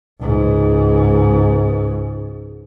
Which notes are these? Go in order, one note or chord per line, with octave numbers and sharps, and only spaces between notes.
C#2 G#2